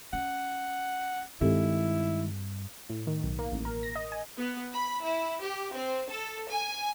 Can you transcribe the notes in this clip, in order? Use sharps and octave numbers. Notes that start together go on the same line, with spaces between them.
C#4 F#5
G2 D#3 G#3 C4 E4 G4 A4
A2
D#3
B1
A#3
A1
A#4
A#6
D#5
G#5
B3
B5
E4
G4
C4
A4
G#5